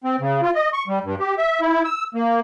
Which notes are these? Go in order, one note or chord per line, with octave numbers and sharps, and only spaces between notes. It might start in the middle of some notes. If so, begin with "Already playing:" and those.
C4
C#3
F4
D#5
C#6
G3
G2
G4
E5
E4
E6
A#3